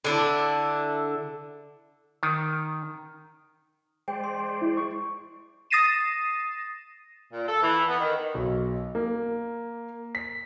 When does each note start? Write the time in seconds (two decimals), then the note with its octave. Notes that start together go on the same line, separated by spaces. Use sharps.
0.04 D3 D4 E4
2.23 D#3
4.08 G#3 C5 D5 G5
4.24 C6
4.62 E4
4.77 C#6
5.70 D#6 A6 A#6 C7 D#7 E7
7.32 A#2
7.48 A4
7.63 E3
7.88 B3
8.00 D#3
8.34 B1
8.95 A#3
10.15 B6